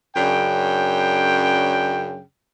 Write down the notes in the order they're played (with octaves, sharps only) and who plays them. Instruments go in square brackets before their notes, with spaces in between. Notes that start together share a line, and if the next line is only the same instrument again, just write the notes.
[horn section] F#2 C#3 D4 G5